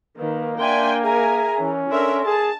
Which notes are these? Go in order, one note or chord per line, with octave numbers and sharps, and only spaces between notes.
D#3 A#3 B4
D4 D5 E5 G5 G#5 C6
G#4 A#4 E5 G#5 A#5
E3 C#4
D4 A4 A#4 E5 C6
G#4 A5